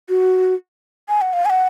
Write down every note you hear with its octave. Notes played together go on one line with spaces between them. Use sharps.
F#4
G#5
F#5
F5
G#5
F#5